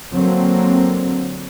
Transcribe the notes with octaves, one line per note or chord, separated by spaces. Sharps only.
D3 F#3 A#3 C4